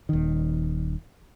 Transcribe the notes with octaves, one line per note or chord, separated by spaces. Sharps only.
D#1 D#3